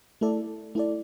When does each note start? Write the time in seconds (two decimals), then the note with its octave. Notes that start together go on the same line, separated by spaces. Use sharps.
0.21 A3 E4 A4 D5
0.75 A3 E4 A4 D5